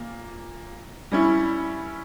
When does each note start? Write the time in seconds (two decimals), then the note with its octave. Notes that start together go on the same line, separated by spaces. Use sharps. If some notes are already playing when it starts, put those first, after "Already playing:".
Already playing: A#2 A#3
1.11 G3 C#4 E4